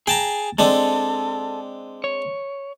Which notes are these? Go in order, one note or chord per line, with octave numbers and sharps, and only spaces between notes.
G#4 G5 A5 A#5
G#3 C4 D4 A4
C#5